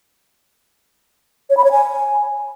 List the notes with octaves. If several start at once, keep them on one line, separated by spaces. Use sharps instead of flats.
C#5
B5
C#5
G#5